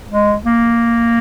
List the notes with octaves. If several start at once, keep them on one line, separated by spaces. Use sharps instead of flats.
G#3
A#3